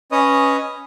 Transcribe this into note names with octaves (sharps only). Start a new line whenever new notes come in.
C#4 B4 C#5 D#5 D#6